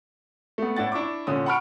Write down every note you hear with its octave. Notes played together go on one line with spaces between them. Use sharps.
A3 B3
A2 D4 E4 F#5 A6
D4 E4 C#6 D6
A#2 D3 C#4 D#6
F#5 A5 B5 C#6 F6 D7